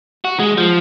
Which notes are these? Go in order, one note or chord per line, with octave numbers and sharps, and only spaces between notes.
F#4
G#3
F3